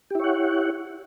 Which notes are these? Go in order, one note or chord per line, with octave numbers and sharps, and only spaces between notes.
E4 G4 C#5 F#5